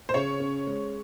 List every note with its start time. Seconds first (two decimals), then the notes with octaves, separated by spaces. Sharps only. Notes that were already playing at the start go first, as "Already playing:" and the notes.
0.09 C5
0.14 C#3 C#5
0.40 C#4
0.67 G#3